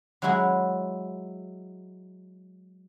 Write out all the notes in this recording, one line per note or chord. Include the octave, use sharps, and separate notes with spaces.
F#3 G#3 E4 F#4 G#4